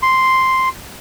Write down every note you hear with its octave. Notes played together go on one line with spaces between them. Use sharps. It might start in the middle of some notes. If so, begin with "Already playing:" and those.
C6